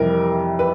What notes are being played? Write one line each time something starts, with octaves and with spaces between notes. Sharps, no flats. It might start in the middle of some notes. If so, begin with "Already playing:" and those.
Already playing: F2 C3 E3 G3 A#4
B4